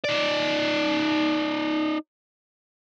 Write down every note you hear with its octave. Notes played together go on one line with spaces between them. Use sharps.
D#4 D5